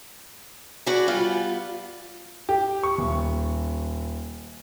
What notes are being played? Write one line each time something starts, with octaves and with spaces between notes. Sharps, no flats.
F#4 G#4 B4 D5
G3 B3 F4
G4
C#6
D#1